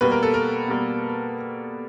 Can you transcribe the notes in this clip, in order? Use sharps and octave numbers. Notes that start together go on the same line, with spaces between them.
B2 G3 A#3 B4
A#4
A4
A#4
B2 G3 A#3